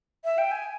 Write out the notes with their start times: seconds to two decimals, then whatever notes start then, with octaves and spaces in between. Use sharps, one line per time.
0.24 E5
0.38 G5
0.51 G#5